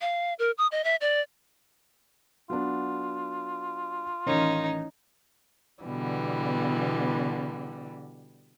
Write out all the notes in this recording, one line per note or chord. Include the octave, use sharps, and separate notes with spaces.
F5
A#4
D#6
D#5
E5
D5
F#3 B3 D4 F4
A1 D#3 C#4 D#4
B2 D3 E3 G3 B3